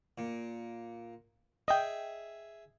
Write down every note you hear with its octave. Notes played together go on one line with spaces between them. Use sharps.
A#2
G#4 D#5 E5 G5